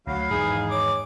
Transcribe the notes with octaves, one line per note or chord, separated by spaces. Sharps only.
D2 F#3 F5 B5
E2 G#2 D#3 E3 D#4 G#4
C#5 D6